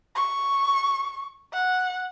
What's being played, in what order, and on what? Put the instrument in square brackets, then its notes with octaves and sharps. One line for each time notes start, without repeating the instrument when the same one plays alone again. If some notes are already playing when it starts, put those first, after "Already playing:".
[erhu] C#6
F#5